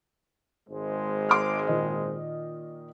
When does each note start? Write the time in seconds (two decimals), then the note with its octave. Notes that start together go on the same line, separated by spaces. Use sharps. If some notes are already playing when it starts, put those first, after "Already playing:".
0.69 G#1 G#3 C5
1.29 C6 D6 F6
1.67 A#2 D#3 D#5